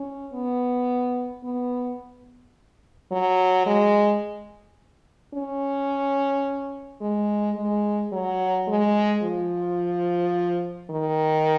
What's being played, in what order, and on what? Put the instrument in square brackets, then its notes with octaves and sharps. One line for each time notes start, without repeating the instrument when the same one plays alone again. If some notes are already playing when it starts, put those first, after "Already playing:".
Already playing: [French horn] C#4
B3
B3
F#3
G#3
C#4
G#3
G#3
F#3
G#3
F3
D#3